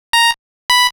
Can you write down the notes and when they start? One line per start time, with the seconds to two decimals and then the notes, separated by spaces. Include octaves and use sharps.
0.13 A#5
0.70 B5